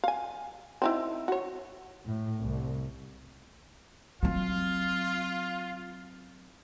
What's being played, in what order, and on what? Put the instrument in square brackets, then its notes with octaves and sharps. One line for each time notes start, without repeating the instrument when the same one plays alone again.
[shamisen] F5 G#5
C4 D#4 E4
F#4 C#5
[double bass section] A2
C2
[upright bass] F#3 C4 [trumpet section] F4